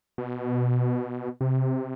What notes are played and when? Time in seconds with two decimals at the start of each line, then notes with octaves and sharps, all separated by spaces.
0.18 B2
1.41 C3